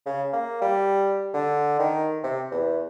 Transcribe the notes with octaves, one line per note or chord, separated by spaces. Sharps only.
C#3
A#3
G3
D3
D#3
C3
E2